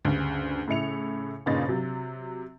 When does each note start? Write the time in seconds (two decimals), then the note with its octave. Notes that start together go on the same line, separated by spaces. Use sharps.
0.05 D2 G2 C#3
0.68 A2 C#3 E4 C#7 F7
1.46 G1 A#2 C#3 D#4 B5 A6
1.68 C3 F#3